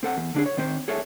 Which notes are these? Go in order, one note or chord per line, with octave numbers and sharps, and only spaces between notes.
C4 A4 F#5
E2
D3 D4 G#4
C#5
D#3 C4 C5
G#4 A4 C#5 E5